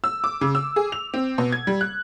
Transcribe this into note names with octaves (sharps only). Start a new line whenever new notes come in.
E6
D6
C#3
E6
G#4
F7
C4
B2
G#6
G3
F#6